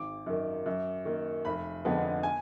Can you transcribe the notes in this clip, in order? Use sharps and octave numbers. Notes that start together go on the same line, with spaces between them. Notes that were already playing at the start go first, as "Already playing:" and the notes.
Already playing: G#1 D6
F#2 D#3
F#2
D#3 A#3
F1 B5
F2 D3 G#3 B3
G#5